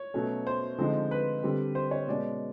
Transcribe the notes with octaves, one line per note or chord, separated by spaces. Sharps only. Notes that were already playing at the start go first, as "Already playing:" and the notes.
Already playing: C#5
B2 F#3 A3 C#4
C5
D3 F3 G#3 C4 D#4
B4
D3 G3 C4
C5
C#5
B2 G#3 C#4 D5